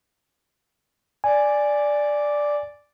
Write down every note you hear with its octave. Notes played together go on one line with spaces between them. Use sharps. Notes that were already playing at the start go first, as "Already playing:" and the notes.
D5 G#5